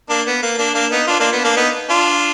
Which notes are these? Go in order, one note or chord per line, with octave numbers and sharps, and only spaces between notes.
A#3 D4
B3
A#3
A#3 D4
A#3 D4
B3 D#4
D4 F4
A#3 D4
B3
A#3 D4
B3 D#4
D4 F4